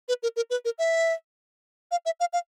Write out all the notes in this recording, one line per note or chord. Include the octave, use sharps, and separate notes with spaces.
B4
A#4
A#4
B4
A#4
E5
F5
E5
F5
F5